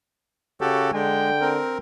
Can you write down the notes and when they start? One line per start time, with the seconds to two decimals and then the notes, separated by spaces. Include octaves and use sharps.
0.61 C#3 F#4 G4 A4
0.93 D3 G#3 G5
1.41 C4 A#4